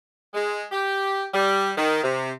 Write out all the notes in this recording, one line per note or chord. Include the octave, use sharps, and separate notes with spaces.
G#3
G4
G3
D#3
C3